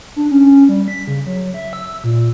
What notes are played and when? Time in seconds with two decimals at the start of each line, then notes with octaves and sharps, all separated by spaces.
0.16 D4
0.31 C#4
0.69 G3
0.88 B6
1.07 C#3
1.26 F#3
1.54 E5
1.73 E6
2.04 A#2